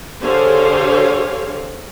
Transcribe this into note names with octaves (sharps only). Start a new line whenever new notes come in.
D3 G4 G#4 C5 C#5 F5